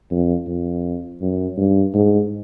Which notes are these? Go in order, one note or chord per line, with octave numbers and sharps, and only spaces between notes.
F2
F2
F#2
G2
G#2